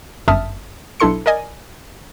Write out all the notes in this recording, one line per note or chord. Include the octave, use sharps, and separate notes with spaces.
G1 F#2 E5 A5 D#6 F6
B1 D4 E4 A4 C6 C#7
A#4 D5 D#5 G#5